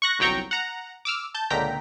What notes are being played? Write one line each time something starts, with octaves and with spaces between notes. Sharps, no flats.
C#6 F#6 A#6
G1 C2 F#3 G5 A#5 C#6
F#5 A#5
D6 E6 F6
A5 G6
C#2 A#2 D3 G5 A#5 B6